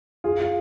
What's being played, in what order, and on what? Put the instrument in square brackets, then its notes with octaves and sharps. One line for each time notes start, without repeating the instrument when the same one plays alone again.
[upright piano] F4 [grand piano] G#4
[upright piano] F4